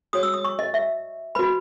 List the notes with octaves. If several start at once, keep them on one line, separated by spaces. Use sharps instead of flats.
F#4 C#5 D#6
E6
D#6
C#6
D#5
E5
F#4 B4 B5